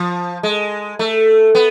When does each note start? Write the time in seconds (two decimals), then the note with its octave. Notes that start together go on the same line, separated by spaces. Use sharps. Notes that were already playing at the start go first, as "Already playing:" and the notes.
Already playing: F3
0.43 G#3
0.99 A3
1.55 B3